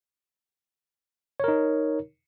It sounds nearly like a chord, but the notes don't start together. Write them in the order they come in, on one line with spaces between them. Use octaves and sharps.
C#5 A#4 D#4